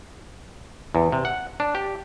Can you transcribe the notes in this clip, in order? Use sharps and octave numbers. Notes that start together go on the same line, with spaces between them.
E2
C3
F#5
D4
G4